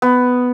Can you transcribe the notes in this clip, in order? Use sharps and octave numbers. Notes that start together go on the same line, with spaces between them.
B3